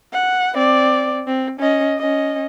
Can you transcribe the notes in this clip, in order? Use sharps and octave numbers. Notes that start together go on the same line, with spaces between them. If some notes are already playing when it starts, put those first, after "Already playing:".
F#5
C4 D5
C4
C#4 D#5
C#4 D#5